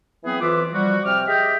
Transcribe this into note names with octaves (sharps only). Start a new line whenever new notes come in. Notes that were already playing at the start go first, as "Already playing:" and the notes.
E3 F#3 B3 C4 G#4 B4
F2 E3 F4 B4 E5 D6
F3 G3 F#4
C3 G5 D6 F6
G4 G#4 D#5 E5 G5